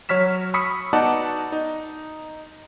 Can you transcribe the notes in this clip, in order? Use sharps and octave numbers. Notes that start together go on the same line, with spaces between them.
F#3 C#5 F6 B6 E7
B5 C#6 D#6 E6 B6 C#7
B3 D#4 F#4 D5 F#5 A5
D#4